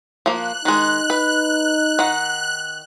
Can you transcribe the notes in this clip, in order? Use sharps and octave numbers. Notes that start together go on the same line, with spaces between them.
F3 A#3 F#6
D#3 G#3 D#4
B4
D#3 F#5